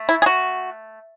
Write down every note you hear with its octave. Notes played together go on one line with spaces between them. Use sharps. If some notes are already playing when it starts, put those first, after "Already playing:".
Already playing: A3
E4
G#4
F#4